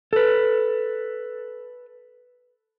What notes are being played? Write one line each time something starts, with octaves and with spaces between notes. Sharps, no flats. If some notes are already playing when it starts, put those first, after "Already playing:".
A4 B4